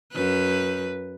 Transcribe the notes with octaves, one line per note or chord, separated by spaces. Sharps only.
F#2 B4